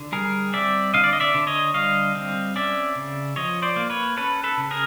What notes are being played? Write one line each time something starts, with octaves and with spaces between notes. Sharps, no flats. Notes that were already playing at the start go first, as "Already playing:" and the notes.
Already playing: D3
G3 G#4 A#4
C4 D5 E5
D3 D#5 F5
D5
D#5
D5 E5
D3
C#5 D#5
G3 D#5 F5
C4
C#4 D5 E5
C#3
F3 C#5 D#5
C5 D5
A#3
B4 C#5
C#4 A4 B4
A4 B4
C#3
G#4 A#4